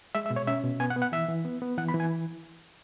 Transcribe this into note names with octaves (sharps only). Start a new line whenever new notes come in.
G#3 E5
E5
B2
C#5
C#4 E5
B2
B3 G#5
F#5
B3
F#5
E3 E5
E3
B3
B3
E3 F#5
B5
E3
G#5